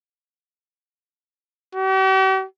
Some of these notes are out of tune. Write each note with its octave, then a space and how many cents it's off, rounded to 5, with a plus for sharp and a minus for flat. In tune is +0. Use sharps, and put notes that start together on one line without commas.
G4 -45